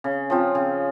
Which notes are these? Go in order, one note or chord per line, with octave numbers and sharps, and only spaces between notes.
C#3
F3 C4 F4
C#3